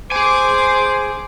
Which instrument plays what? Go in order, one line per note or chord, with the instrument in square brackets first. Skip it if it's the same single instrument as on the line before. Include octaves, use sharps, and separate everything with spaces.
[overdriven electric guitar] G#4 G#5 [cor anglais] C5 [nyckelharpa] D6